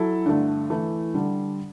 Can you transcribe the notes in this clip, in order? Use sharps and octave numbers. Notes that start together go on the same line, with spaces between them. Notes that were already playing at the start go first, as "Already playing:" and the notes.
Already playing: F#3 E4 A4
G2 D3 A3
E3 A3 E4
D3 G3 D4